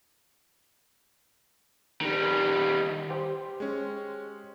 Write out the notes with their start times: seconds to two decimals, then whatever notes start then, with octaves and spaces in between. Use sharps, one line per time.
2.01 D#3 G3
3.10 G4 C5
3.60 G#3 C#4